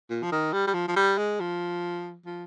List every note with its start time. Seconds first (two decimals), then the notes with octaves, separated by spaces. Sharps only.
0.10 A#2
0.23 F3
0.32 D#3
0.53 G3
0.67 G3
0.74 F3
0.88 F3
0.96 G3
1.18 G#3
1.40 F3
2.26 F3